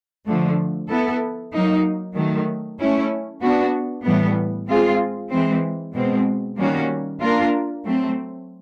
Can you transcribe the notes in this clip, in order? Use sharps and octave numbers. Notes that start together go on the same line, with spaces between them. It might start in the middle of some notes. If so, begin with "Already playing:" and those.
D3 F3 A3
B3 E4 A4
F#3 A#3 D#4
D#3 F#3 A3
A3 C#4 E4
B3 D4 F#4
A2 E3 G3 B3
G#3 C4 F4 G#4
E3 G#3 C4
B2 G#3 C4
D#3 G3 A#3 C#4 F#4
A#3 D4 F4 A#4
F#3 A3 C4